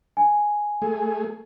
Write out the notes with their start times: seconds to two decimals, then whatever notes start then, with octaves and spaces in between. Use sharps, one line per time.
0.17 G#5
0.82 A3 G#4